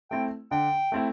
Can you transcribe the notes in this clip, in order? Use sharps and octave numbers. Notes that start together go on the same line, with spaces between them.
A3 C4 E4 G5
D3 G5
A3 C4 E4